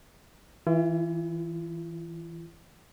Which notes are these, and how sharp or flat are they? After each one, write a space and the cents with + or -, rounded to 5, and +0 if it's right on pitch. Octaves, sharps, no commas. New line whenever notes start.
E3 -10 F4 -45